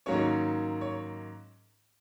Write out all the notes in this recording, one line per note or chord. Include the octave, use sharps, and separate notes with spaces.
G#2 D#3 F#3 A#3 C#4 C#5
C#5